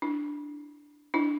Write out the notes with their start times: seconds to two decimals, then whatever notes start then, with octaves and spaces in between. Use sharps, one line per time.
0.02 D4 E4
1.14 D4 E4